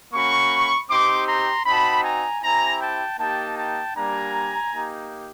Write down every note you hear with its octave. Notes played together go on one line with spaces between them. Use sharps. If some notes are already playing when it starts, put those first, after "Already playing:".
A#3 C#4 F#4 B5 C#6
C4 D#4 G4 C6 D6
A#5 C6
C4 D#4 F#4 A5 B5
G#5 A#5
C4 E4 G4 G#5 A#5
G5 A5
A#3 D#4 G4 G5 A5
G5 A5
G3 A#3 D4 G4 G#5 A#5
A#3 D#4 G4